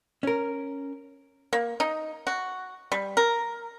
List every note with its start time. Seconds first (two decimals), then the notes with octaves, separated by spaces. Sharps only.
0.23 C#4 A#4
1.53 A#3
1.80 D#4
2.27 F#4
2.92 G3
3.17 A#4